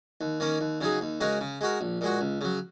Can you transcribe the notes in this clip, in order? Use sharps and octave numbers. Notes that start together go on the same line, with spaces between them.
D#2
D#3 A#3 C#4
D#2
C#3 F#3 D#4 G#4
D#2
C#3 G#3 F#4 A#4
C#3
G#3 F#4 A#4
A#1
A#2 G#3 F#4
C#2
C#3 F#3